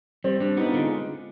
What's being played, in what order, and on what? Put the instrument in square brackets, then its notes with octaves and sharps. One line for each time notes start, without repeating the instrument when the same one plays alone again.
[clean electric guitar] G3 [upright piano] C4
[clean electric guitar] G3 [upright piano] D4
[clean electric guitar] B3 [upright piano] D#4
[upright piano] F4
[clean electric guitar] D3 [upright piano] D#4
[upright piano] G#3